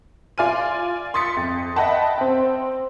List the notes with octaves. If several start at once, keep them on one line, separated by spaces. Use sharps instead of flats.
F4 D5 G#5 F6 D#7
C6 D#6 A6 B6 C#7
F2
D#5 E5 F#5 G5 A5 B5
C4 G5